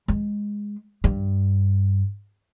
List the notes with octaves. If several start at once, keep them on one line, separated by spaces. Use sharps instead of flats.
G#3
G2